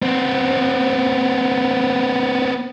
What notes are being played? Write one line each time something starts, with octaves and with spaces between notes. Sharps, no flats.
B3 C4